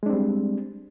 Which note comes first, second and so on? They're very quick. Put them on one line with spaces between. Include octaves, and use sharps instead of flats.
G#3 D4 C4 G3